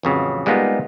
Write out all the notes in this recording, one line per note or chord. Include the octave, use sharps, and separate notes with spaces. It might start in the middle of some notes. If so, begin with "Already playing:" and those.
A1 F2 C#3 F#3
G3 G#3 A#3 B3 D#4 F4